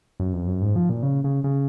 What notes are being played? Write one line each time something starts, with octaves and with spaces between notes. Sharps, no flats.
F#2
F2
F#2
G#2
F3
A#2
C#3
C#3
C#3